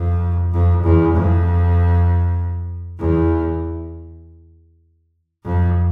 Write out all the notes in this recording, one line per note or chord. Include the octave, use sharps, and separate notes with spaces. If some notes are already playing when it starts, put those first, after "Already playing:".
Already playing: F2
F2
E2
F2
E2
F2